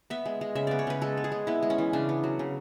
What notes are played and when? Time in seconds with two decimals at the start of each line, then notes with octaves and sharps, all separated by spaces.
0.10 B3 E5
0.26 G#3
0.41 G#3
0.55 C#3 E5
0.67 B3 D5
0.79 C#5
0.87 C#3 B4
1.02 G#3 A4
1.17 B3
1.24 G#4
1.32 G#3
1.47 B3 E4
1.63 G#3
1.70 C#4
1.78 E3
1.93 C#3 D4
2.09 B3
2.24 F#3
2.39 C#3